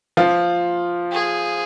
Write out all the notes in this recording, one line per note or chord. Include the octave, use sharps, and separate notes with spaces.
F3 F4
G#4